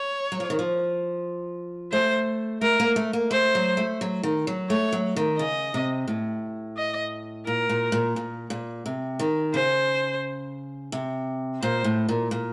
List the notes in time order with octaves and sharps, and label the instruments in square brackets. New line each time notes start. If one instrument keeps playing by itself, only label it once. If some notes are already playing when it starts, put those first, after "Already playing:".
Already playing: [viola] C#5
[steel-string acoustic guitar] F#3
F3
D#3
F3
[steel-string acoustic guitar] A3 [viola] C5
[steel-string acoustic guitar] A3 [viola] A#4
[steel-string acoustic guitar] A#3
A3
A#3
[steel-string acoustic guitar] A3 [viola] C5
[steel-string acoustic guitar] F#3
A3
F#3
D#3
F#3
[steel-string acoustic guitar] A3 [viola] C#5
[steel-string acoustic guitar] F#3
D#3
[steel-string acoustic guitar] C#3 [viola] D#5
[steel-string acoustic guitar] C3
A2
[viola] D#5
[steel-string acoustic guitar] A#2 [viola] A#4
[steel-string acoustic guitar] A#2
A#2
A#2
A#2
C3
D#3
[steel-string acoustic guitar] C#3 [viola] C5
[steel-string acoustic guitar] C3
[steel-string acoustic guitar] A#2 [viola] C5
[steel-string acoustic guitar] A2
A#2
A#2